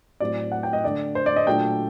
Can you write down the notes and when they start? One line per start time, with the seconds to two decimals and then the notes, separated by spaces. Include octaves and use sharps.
0.20 A2 F#3 C4 D5
0.52 F#5
0.63 G5
0.73 D#5
0.84 D3 A3 D4 D5
1.15 C5
1.26 D5
1.36 D#5
1.47 A#2 F#3 A3 D4 G5